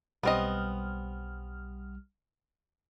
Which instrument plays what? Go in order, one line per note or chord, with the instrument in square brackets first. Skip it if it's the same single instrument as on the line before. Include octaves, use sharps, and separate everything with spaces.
[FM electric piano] B1 G3 F6 [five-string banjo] B3 C4 D#5